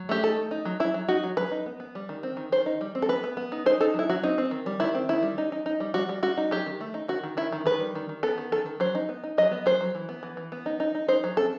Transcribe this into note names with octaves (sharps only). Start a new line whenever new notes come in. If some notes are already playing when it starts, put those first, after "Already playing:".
Already playing: F#3
A3 G4
D#4 A4
A3
D#4
F#3
F#3 E4
F#3
D#4 F#4
F#3
F#3 B4
D#4
B3
B3
G3
D#3
C4
D#3
D#3 C5
D#4
G3
C4
A4
B3 B4
B3
B3
D#4
D#4 C5
D#4 A4
F#3 E4
F#3 F#4
C4 D#4
C4
D#3
G3
D#3 E4
C4
D#3 E4
G3
D#4
D#4
D#4
G3
G3 F#4
G3
G3 F#4
D#4
F#3 G4
D#3
A3
D#4
D#3 F#4
D#3
D#3 E4
D#3
D#3 B4
G3
D#3
D#3
B3 A4
D#3
D#3 A4
D#3
F#3 C5
D#4
B3
D#4
F#3 D#5
B3
F#3 C5
F#3
E3
B3
E3
E3
B3
D#4
D#4
D#4
D#4 C5
F#3
C4 A4